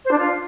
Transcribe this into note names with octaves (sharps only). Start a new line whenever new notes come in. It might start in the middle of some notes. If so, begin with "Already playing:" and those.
C5
D4
F4